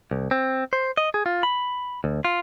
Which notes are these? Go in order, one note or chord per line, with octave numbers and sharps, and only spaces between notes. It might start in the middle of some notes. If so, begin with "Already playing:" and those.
C2
C4
C5
D#5
G#4
F4
B5
D2
F4